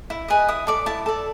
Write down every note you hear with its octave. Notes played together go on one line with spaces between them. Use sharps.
E4
G#4 B4 D#5
E4 D#6
A4 D5 D6
E4 A5
A4 D5